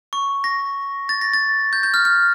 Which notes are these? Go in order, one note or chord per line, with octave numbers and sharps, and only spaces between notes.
C#6
A#6
A6
A#6
A6
G6
G6
F6
F6